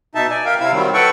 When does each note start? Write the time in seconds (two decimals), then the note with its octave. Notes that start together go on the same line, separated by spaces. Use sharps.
0.15 B2 D#4 E5 A5
0.30 D5 G#5
0.45 A#4 E5 F5 G5
0.60 C3 C4 E4 F5 E6
0.72 D#3 F#3 G3 C4
0.94 A4 B4 F#5 G5 A5 C#6